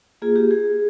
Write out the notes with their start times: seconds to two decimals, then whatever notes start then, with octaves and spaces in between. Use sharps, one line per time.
0.22 A#3 F4 G#4
0.36 G4
0.51 G#4